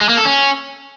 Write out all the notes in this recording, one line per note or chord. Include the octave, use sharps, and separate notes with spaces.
G#3
A#3
A4
C#4